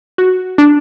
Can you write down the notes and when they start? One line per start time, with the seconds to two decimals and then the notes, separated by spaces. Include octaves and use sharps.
0.18 F#4
0.58 D4